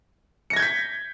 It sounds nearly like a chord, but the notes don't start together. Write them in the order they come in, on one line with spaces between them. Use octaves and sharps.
C#7 A#6 G#6 G6 B6